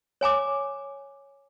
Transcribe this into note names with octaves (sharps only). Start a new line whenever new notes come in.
C#5 G#5 A#5 D6